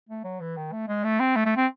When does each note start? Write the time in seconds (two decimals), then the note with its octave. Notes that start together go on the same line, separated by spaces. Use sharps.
0.09 A3
0.24 F#3
0.41 E3
0.57 D#3
0.72 A3
0.88 G#3
1.04 A3
1.20 C4
1.36 A3
1.46 A3
1.57 C4